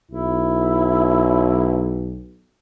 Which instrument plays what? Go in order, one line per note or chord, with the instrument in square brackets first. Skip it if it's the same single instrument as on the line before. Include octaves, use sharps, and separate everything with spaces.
[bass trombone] B1 [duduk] E4